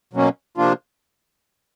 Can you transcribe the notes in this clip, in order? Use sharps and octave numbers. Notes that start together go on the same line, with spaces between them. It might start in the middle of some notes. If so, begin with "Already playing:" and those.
B2 F#3 A#3 C#4
C3 F3 A#3 D4 F4